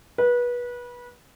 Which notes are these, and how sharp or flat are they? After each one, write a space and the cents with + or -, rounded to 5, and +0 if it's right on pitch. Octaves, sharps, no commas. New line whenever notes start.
B4 -25